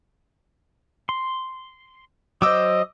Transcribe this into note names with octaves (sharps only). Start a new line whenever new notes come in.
C6
F#3 C5 D#5 D6 E6